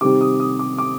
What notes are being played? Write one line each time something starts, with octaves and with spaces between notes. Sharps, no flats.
C3 D#3 G3 C4 D6
D#6
D#6
D6
D6